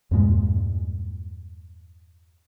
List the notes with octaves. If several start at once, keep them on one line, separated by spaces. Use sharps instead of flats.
E2 G2 A#2 G#3